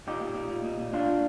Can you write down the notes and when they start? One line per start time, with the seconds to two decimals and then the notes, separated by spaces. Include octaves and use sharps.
0.07 A#2 D#4 G4
0.22 A#2
0.36 A#2
0.50 A#2
0.64 A#2
0.79 A#2
0.92 A#2 D4 F4
1.07 A#2